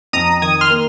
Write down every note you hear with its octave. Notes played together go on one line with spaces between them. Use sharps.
F2 A#5 D#6
D#3 D#6 G#6
C6 F6
A#3